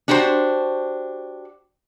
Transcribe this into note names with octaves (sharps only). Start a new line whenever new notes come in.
D4 F#4 G4 A#4 C5